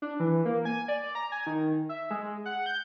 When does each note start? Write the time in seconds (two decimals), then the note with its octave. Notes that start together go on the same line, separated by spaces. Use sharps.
0.02 D4
0.20 E3
0.45 A#3
0.65 G#5
0.88 D5
1.15 A#5
1.32 G#5
1.46 D#3
1.89 E5
2.11 G#3
2.45 F#5
2.66 G6